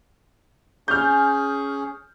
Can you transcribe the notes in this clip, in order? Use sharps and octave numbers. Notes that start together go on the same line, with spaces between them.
C#4 G#4 F6 G6